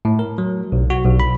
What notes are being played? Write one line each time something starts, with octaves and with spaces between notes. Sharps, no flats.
A2
A#4
F#3
B1
F#4
B1
B5